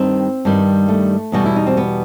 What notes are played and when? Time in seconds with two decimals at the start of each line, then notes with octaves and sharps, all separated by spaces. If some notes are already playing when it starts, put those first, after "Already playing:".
Already playing: G2 D#3 G3 C4
0.45 G2 D#3 G3
0.88 A3
1.32 E2 B2 G3 F#4
1.46 E4
1.56 D#4
1.67 C4
1.77 B3